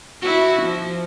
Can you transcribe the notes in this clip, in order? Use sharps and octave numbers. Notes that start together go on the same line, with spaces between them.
E4 F#4
F3